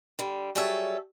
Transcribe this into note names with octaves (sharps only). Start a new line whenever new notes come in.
D3 G3
F#3 G3 G#4 A4 C#5 E5